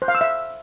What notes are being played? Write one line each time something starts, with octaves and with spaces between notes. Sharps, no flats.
C5
F5
E6
E5